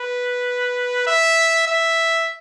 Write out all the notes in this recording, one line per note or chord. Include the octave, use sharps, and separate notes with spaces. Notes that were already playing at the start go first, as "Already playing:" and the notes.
Already playing: B4
E5
E5